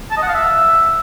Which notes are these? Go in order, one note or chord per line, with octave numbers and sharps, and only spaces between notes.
A5
D#5
F#5
F5
E5